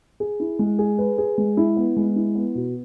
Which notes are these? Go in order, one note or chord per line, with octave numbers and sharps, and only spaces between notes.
G#4
E4
G#3
G#4
B4
G#4
G#3
E4
B3
G#3
E4
B3
B2